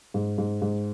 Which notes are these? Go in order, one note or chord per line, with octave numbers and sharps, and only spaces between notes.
G#2
G#2
G#2